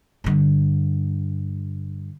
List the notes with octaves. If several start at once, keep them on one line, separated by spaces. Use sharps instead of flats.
G2 D3